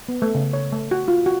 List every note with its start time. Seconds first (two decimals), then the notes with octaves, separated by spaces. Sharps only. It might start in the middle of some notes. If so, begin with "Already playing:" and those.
0.08 B3
0.22 A3
0.35 C#3
0.53 C#5
0.72 A3
0.91 F#4
1.08 F4
1.26 F#4